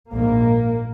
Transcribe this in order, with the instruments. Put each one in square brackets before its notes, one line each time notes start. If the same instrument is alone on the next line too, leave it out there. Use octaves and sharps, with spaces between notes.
[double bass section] A#1 G#2 A#3